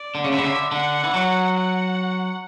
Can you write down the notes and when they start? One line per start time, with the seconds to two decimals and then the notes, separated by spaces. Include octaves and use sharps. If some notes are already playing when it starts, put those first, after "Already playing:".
Already playing: D5
0.15 D3
0.24 C#3
0.30 D3 E5
0.39 C#3
0.44 D3
0.72 D3 F#5
1.04 E3
1.14 F#3
1.57 F#5